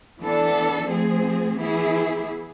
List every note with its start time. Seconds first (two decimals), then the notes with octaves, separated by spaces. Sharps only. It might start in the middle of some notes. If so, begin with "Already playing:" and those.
0.19 E3 B3 D4 A4
0.88 F3 A3 C4 G#4
1.57 E3 B3 E4 G#4